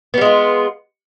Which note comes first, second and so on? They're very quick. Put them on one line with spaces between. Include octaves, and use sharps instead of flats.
B3 G3 G#3 F4